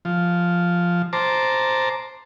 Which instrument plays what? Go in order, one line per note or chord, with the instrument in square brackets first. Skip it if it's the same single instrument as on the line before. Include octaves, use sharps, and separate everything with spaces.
[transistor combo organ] F3
C5 A5 A#5 D6